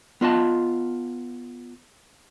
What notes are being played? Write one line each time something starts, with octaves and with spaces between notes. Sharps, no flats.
B3 F4 D#5 A5